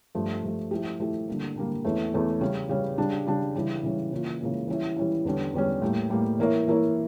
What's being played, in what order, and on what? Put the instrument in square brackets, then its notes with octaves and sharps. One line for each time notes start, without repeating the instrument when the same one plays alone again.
[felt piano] G2 F3 A3
G2 F3 A3
F3 A3 E4 G4
F3 A3 E4 G4
D3 G3 A#3
D3 G3 A#3
E2 E3 A3 C#4
E2 E3 A3 C#4
C#3 G3 C#4
C#3 G3 C#4
C#3 G3 D4
C#3 G3 D4
C#3 E3 G3 C#4
C#3 E3 G3 C#4
C#3 E3 A#3 C#4 F4
C#3 E3 A#3 C#4 F4
E3 G3 C#4 E4
E3 G3 C#4 E4
E2 D3 G3 C#4
E2 D3 G3 C#4
A2 G3 A#3
A2 G3 A#3
E3 A#3 E4 A#4 C#5
E3 A#3 E4 A#4 C#5